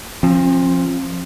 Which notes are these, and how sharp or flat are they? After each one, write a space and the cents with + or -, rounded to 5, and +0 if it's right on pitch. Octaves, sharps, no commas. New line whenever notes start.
F3 +0 C4 +45